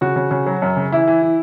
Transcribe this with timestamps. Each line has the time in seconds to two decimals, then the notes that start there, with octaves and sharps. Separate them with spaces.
0.01 C#3 F#4
0.16 C#3
0.31 C#3
0.46 F#3
0.62 F#2
0.76 C#3
0.92 E3 E4
1.08 E3
1.22 E3